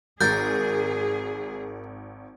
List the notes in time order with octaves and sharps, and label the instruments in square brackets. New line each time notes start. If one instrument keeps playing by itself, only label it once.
[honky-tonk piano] G#1 [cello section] G#4 [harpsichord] A#4 [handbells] G6 A6